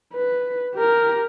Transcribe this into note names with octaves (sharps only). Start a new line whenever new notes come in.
B4
G4 A#4